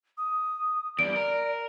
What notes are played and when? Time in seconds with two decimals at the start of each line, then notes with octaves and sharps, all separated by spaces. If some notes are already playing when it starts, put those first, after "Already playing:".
0.18 D#6
0.99 E2 G2 D5 D7
1.16 A#4